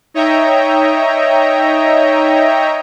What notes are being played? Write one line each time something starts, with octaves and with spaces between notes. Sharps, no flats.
D#4 C#5 D#5 E5 G5 A#5